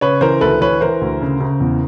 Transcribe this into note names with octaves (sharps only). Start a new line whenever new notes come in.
C#3 B4 C#5
E3 A#4 C5
D2 A4 B4
E3 B4 C#5
E3 A#4 C5
D2
C#3
C#3
E2